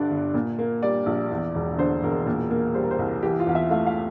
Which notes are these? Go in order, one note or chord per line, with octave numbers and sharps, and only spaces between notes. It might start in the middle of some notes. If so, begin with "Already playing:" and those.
Already playing: G1 G2 D3 D5
G1
A#2
A#3
G3 D5
A#1
E2
E1
D3 C5
E1 A#4
A#2
A#3
G3 C5
A#4
C5
C2
E3 G4
F4
E2 F5
E5
A3 F5
F5